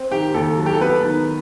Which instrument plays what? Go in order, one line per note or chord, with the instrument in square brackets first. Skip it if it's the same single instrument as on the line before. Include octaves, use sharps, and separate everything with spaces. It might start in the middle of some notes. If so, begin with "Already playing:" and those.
Already playing: [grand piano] C4
[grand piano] D#3 [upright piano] G4
[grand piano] D#2 [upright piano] A4
[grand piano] F#3
[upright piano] G4
A4
[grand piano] B3 [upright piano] B4
[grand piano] D#3